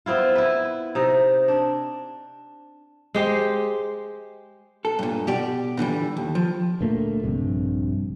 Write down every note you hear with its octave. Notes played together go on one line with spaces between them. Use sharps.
B3 C4 E4 F4
E4 B4
C3 D#4
D4
G#3 G4 C5
A4
G2 A#2
B2 G4 D5
A#2 D3 E3 G3
D#2
F3
D2 A#2 A3 A#3
A#1 G2 C3